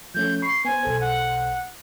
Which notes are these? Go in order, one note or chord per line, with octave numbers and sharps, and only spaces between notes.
F3 A3 C#4 G6
B5 C#6 C7
B3 C5 G#5
B1 A4 C5
F#5